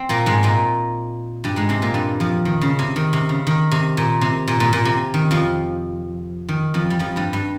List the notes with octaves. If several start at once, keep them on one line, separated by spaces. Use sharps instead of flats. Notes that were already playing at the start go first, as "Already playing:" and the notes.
Already playing: C4
A#2 A#3
G#2 G#3
A#2 A#3
G2 G3
G#2 G#3
C3 C4
A#2 A#3
G2 G3
F2 F3
D#3
C#3
C3
D#3
C3
C#3
D#3
C3
A#2
C3
A#2
A#2
A#2
C3
D#3
F2 F3
D#3
F2 F3
G3
F2 F3
G2 G3
G2 G3